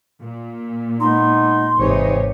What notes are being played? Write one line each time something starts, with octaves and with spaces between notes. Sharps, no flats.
A#2
G#3 B3 D#4 C6
G#1 C3 E3 D#4 G4 C5 C#5